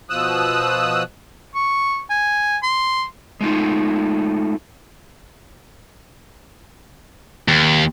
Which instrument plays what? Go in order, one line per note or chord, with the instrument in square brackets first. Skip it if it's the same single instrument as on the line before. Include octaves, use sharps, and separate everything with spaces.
[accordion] B2 F3 D#6 E6 F#6
[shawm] C#6
G#5
C6
[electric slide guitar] G#3 A3 D#4 F4
[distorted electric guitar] D#2